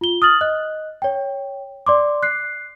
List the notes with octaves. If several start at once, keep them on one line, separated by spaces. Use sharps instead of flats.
F4 G7
D#6 F6 A6 F#7
D#5 F#6
C#5 G5
D5 C6 D6
F#6 C7